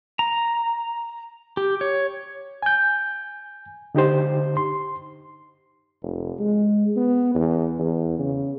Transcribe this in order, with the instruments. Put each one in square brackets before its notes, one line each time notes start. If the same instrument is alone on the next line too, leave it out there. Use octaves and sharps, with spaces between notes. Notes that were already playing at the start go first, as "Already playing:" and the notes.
[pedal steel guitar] A#5
G4
C#5
[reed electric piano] G#5 G6
D3 D#4 G4 C5
C6
[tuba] F1
G#3
B3
E2
E2
C#3